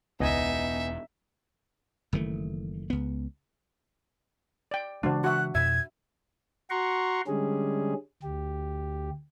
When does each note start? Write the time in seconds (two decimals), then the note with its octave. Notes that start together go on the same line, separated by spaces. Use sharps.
0.20 E1 C#2 B3 D#4 D#5 E5 G#5
2.13 F#1 D#3 E3 A3
2.90 C#2 B3
4.71 D5 G5
5.03 C#3 E3 G#3 D4 F#4 C5
5.24 F#4 E5 F#6
5.55 F2 B2 E5 G#6
6.70 F#4 F#5 A#5 C6 C#6
7.27 D3 G3 G#3 C#4 G#4
8.23 D2 G4